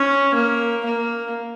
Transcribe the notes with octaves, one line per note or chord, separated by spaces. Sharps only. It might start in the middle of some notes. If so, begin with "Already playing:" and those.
Already playing: C#4
A#3
A#3